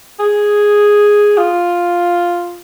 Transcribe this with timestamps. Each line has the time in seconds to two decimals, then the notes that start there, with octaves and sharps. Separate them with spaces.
0.19 G#4
1.38 F4